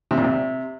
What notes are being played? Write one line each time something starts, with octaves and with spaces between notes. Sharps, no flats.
C3
A#2
C3